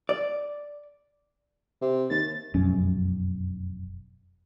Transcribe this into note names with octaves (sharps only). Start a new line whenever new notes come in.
D5
C3
D#2 A6
F1 B1 F#2 C#4